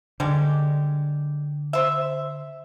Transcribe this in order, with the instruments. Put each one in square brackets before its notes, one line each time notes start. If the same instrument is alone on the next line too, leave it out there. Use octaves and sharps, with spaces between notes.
[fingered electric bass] D3 [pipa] G3 G#3 G4
[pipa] C5 E5